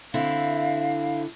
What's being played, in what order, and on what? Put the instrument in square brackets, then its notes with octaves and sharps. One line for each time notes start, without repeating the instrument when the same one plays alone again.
[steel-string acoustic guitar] D3 C4 E4 [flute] F5